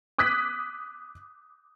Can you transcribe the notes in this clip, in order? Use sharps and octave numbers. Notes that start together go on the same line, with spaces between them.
D6 D#6 F#6 G#6 B6